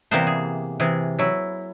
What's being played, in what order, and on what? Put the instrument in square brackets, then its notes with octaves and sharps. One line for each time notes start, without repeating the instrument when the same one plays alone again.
[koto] C3 E3 G3 A#3 B3 C5
G#4
C3 E3 G#4
F#3 E4